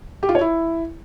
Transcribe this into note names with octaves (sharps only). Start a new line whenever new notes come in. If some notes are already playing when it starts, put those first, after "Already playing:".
G4
F4
C#5
E4